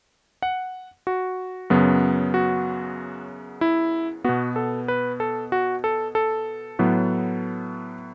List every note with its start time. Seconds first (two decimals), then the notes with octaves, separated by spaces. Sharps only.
0.42 F#5
1.07 F#4
1.70 F#2 C#3 F#3 B3
2.34 F#4
3.61 E4
4.24 B2 B3 F#4
4.56 A4
4.88 B4
5.20 A4
5.52 F#4
5.84 A4
6.15 A4
6.79 A2 F#3 B3